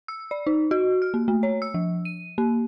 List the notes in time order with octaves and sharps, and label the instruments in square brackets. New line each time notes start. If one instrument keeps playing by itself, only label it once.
[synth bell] E6
D5
D#4
F#4
F6
A#3
A3
C#5
E6
F3
D#7
A#3